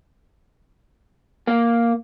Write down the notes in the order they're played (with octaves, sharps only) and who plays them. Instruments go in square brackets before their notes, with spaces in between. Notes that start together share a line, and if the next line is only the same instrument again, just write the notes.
[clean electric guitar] A#3